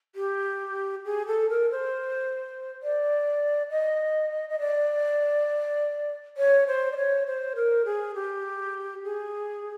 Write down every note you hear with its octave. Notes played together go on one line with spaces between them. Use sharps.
G4
G#4
A4
A#4
C5
D5
D#5
D#5
D5
C#5
C5
D5
C#5
C5
A#4
G#4
G4
G#4